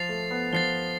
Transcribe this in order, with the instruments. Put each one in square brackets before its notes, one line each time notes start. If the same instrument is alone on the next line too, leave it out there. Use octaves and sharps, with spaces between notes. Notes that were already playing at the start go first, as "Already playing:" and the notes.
Already playing: [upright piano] F3 [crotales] A6 C7 F7
[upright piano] A3
B3
[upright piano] F3 [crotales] A6 C7 G7